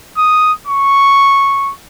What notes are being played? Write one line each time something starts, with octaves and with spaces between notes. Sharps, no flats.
D#6
C#6